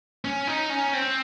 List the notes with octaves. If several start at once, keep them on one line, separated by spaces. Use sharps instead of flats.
C#4
D#4
C#4
C4